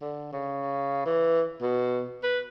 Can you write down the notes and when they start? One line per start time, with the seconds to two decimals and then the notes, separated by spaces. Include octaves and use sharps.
0.02 D3
0.32 C#3
1.06 E3
1.62 B2
2.24 B4